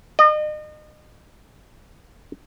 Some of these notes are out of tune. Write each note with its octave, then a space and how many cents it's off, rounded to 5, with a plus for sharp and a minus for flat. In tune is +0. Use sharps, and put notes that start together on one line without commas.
D#5 -35